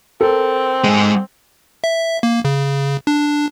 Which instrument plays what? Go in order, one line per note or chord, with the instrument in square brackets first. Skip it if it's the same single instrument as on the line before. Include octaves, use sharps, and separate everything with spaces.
[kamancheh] C4 [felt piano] A4 A#4
[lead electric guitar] G#2 G#3
[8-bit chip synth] E5
A#3
C#3
D4